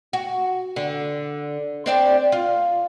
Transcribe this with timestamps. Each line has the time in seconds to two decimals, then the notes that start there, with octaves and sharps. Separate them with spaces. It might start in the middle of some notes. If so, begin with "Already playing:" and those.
0.13 F#4
0.76 D3
1.86 C4 D4 D5
2.32 F4